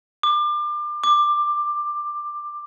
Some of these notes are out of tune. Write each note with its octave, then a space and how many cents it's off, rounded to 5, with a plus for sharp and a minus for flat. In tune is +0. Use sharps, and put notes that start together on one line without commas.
D6 +30
D6 +15